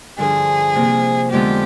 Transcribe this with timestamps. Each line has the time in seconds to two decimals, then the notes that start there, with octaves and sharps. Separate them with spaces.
0.18 G2 D3 F3 G#4
0.75 C3 F3 A#3
1.32 F2 D3 F3 G#3 B3 G4